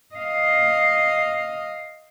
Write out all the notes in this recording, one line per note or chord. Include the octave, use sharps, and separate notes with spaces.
D#5 F5